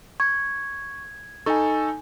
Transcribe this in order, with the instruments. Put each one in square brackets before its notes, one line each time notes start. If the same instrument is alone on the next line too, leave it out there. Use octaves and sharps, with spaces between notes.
[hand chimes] C#6 [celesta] G#6
[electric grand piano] D#4 A4 [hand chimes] G#5 C#6